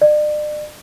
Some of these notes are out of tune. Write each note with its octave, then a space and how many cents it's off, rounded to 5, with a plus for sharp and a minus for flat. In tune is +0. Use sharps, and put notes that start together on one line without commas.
D5 +40